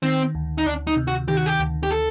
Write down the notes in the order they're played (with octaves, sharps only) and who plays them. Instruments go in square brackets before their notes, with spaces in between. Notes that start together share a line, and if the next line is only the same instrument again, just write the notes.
[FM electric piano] D#3 [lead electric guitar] C4
[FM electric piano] D2
[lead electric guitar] D#4
[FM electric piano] D2 [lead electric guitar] D4
[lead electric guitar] D#4
[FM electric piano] C3
[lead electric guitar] F#4
[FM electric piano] D#3 [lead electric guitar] G4
[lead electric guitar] F#4
G4
[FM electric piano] D2
[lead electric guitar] G4
A4